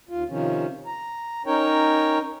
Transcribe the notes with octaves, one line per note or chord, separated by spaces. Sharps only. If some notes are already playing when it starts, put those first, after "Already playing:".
D#2 F4
C3 D#3 F3 C#4
A#5
C#4 D#4 A#4 C#5 G5